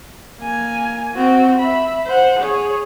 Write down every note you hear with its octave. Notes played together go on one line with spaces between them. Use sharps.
A#3 G#5
C4 F#4
E5 B5
C5 F#5
G#4 C#5